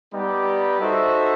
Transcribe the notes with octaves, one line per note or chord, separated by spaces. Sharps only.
G3 B3 D#4 G4
D#4 F#4 A4 C5 E5